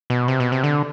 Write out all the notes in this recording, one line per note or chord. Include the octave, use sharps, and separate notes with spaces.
B2
C3
B2
C3
D3